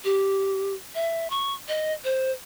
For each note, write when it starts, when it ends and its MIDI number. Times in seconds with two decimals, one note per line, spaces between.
0.04 0.73 67
0.95 1.28 76
1.30 1.54 85
1.68 1.93 75
2.04 2.32 72